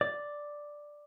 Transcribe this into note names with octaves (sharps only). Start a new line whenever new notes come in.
D5